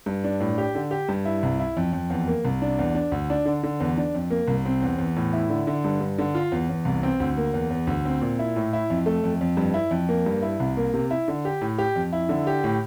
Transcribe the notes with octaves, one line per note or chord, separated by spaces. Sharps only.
G2
D4
A2
G4
D3
G4
G2
E4
C2
E4
F2
F2
E2
A#3
C2
D4
E2
D4
D2
D4
D3
D3
E2
D4
F2
A#3
C2
C4
E2
E2
A2
E4
D3
D3
G2
G2
D3
F4
E2
E2
C2
C4
D2
A#3
E2
E2
D2
C4
A#2
E4
A2
E4
F2
A3
F2
F2
G2
E4
F2
A#3
G2
E4
C2
A#3
C3
E4
D3
G4
A2
G4
F2
E4
D3
G4
A2